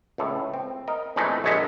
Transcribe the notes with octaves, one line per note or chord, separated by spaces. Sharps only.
C#2 A2 A4
C4
A#4 D#5
F2 A#2 E3 G#3 A3 D#4
A#1 D#2 G#3 C#5 D#5 E5